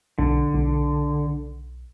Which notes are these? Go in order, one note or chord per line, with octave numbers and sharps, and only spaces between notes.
B1 D3
B1